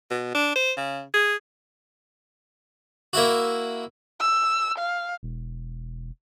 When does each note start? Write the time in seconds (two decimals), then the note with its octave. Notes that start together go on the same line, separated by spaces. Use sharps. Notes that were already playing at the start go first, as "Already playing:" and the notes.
0.11 B2
0.34 D4
0.55 C5
0.77 C#3
1.14 G#4
3.13 A#3 E4 F#4
4.21 E6
4.79 F5
5.23 E1